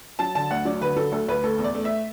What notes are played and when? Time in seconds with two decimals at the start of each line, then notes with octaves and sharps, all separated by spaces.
0.19 F#3 A5
0.35 D3 A5
0.51 D2 F#5
0.65 F#3 D5
0.81 D3 B4
0.96 F#3 A4
1.12 D2 A4
1.28 D2 B4
1.44 A3 A4
1.59 E2
1.64 D5
1.75 A3
1.85 E5